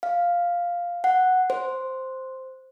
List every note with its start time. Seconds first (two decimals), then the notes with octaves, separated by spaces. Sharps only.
0.03 F5
1.04 F#5
1.50 C5